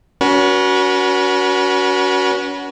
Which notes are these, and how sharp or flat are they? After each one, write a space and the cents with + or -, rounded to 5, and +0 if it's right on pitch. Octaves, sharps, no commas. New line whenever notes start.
C#4 +30 F#4 +10 B4 -35